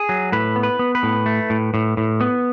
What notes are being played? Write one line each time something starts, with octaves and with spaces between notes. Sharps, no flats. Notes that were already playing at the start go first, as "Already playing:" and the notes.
Already playing: G#4
F#3
A2 B4
B3
B4
B3
B4
A2
A3
A2
A2
A2
B3